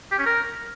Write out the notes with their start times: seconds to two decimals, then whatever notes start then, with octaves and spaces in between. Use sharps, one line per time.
0.11 G4
0.18 C#4
0.26 A#4